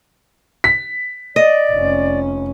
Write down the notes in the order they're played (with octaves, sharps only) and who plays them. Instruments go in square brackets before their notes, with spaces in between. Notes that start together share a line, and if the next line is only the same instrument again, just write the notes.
[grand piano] B6
[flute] D5 [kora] D#5
[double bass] F1 C#4